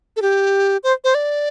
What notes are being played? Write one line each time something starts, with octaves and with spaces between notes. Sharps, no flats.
A4
G4
C5
C5
D5